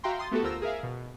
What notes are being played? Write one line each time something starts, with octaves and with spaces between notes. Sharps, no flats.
F#4 E5 F5 G5 A#5 C6
C6 D#6 A6
A3 B3 F#4 G4 A4
D2 F4 A#4 C5 E6 A#6
G#4 A#4 E5 F5
B2